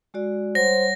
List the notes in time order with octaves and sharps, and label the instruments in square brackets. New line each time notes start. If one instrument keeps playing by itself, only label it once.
[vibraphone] G#3 F#4 D5
[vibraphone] G3 C#5 F#5 [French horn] C5 [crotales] A#6